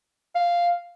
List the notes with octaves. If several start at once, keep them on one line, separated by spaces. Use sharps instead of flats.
F5